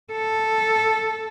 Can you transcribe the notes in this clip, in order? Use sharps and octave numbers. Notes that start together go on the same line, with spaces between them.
A4